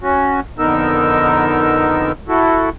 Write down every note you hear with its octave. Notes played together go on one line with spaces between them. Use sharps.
C#4 F#4
F2 D3 B3 D#4 A#4 E6
E4 F#4 A4